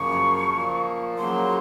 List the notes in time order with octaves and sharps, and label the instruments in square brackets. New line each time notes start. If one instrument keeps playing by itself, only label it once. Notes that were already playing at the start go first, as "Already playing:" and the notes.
Already playing: [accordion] F#2 C#3 F3 A#3 [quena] C#6
[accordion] A#2 F3 A#3
[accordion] C#3 F#3 A#3 [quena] C6